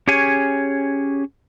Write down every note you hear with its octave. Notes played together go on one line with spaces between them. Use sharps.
C#4 G4 G#4 C#5 G#5